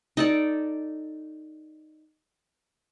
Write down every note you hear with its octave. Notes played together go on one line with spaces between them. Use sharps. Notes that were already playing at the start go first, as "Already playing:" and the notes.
D#4 A4 D5